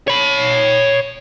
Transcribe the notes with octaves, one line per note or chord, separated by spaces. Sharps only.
C#5 B5